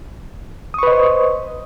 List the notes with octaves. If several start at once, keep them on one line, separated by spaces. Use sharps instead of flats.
B4 C5 D#5 C#6 D#6